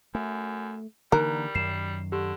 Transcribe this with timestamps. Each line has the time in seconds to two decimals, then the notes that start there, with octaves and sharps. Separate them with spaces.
0.15 F#2 A3
1.12 D3 E3 G3 A#3 D#4 A#4 A#5 F#6
1.55 F#2 D#3 C7 E7
2.12 D3 G4